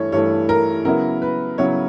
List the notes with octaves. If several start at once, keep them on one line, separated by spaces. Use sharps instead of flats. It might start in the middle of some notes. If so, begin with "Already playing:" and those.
Already playing: G2 E3 A3 C#5
G2 E3 A3 C#5
A#4
C#3 F#3 B3 E4 A#4
B4
C#3 F#3 B3 E4 C#5